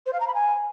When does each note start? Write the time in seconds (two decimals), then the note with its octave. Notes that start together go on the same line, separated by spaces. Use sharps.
0.06 C5
0.13 F5
0.20 A#5
0.27 B5
0.34 G#5